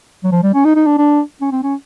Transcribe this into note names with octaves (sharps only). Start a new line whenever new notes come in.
F#3
F3
G3
C#4
D#4
D#4
D4
D4
C#4
C4
C#4